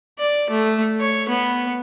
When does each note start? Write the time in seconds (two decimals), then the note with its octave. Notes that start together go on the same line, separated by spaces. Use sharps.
0.19 D5
0.50 A3
1.00 C#5
1.29 B3